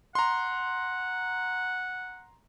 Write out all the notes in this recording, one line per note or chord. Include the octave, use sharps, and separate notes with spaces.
F#5 A#5 C6